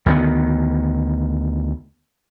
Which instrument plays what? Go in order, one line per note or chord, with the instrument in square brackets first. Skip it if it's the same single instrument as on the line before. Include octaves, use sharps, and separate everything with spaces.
[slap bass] D2 D#3 F3 B3